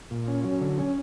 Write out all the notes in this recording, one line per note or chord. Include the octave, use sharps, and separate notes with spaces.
A#2
C#4
F#3
D3
C#4